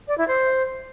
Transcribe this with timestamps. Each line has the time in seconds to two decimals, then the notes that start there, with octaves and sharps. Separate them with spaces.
0.08 D5
0.18 E4
0.28 C5